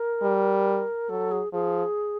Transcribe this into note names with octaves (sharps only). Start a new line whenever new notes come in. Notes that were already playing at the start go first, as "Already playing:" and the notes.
Already playing: A#4
G3
F#3 A4
G#4
F3 G#4